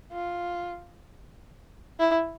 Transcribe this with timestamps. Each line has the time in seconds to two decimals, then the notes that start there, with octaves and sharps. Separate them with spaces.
0.12 F4
2.00 E4